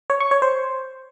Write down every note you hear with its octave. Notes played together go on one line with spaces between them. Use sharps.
C#5
C#6
C#5
C5